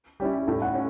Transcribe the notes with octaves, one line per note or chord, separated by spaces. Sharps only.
G3 C#4 E4 G4
A2 A4
F#5
C#4